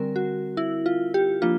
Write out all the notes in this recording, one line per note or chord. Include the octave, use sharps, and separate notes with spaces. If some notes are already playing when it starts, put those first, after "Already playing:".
Already playing: D3 G3 C4 A#4
F#4
E4
F4
G4
F3 A#3 D4 F4